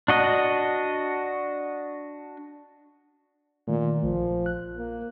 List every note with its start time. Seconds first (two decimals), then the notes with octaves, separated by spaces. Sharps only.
0.08 D4 F#4 D#5
3.68 A#2 D#3 A3
4.03 A#1 F3
4.46 F#6
4.77 A#3